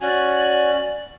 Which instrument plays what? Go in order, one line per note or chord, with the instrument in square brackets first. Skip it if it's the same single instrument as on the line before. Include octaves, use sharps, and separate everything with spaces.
[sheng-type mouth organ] C#4 F#4 G#5 [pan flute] D5